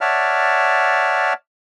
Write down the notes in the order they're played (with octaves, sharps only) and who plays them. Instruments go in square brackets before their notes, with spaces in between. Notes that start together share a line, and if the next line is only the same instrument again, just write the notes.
[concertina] C#5 D5 E5 F#5 A5 F6